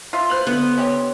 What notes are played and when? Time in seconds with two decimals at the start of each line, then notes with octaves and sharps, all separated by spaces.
0.13 F4 E5
0.30 B4 C5 F#6 F7 F#7
0.47 D3 B3
0.78 C#4 G4 C#5